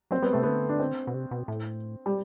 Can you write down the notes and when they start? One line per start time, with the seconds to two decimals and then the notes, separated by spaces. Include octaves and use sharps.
0.11 F#3 C4
0.22 G3 B3
0.33 C3 A3
0.43 D3 B3
0.69 D4
0.80 C4
1.07 B2
1.14 C3
1.31 B2
1.48 A2
2.06 G3